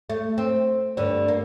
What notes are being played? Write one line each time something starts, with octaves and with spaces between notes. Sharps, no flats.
A3
C4
D2 G2 D3
A#3